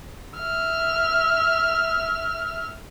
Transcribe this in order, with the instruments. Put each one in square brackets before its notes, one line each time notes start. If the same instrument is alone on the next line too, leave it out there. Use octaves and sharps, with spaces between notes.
[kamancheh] E5 F6